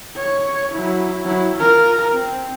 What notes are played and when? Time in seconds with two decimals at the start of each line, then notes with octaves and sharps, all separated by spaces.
0.16 C#5
0.73 F#3 E4
1.25 F#3 E4
1.57 F4 A#4
2.13 C4